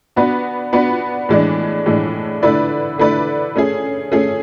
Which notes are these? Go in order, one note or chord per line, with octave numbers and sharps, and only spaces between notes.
B3 D4 F#4 B4
B3 D4 F#4 B4
A2 E3 G#3 D4
A2 E3 G#3 D4
D3 A3 E4 B4 D5
D3 A3 E4 B4 D5
A3 C#4 G#4
A3 C#4 G#4